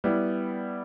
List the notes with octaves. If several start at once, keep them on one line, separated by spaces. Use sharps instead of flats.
G3 B3 E4